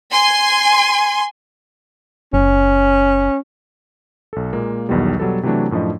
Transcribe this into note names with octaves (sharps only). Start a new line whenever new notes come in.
G#5 C6
F#1 C#4
B1 A4
A#2 G#3 A#3
B1 E2 B2 D#3 G3
B2 F#3 G3 A4
C3 E3 F#3 A3 D4
F#2 A2 F3 D4 D#5